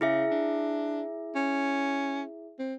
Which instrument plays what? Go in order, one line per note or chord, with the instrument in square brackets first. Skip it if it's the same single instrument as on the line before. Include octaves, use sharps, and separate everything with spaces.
[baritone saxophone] C#3 [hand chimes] E4 G#4 E5
[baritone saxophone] D4
C#4
C4